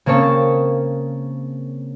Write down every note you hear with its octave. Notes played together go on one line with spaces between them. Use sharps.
C#3 A#3 C4 C#5 A5